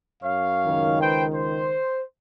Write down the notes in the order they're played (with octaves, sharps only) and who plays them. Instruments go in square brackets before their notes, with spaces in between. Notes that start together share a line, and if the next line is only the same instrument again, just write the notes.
[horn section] F#2 C#5 F5
[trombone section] C#2 D#3
[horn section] B4 C5 G5
C5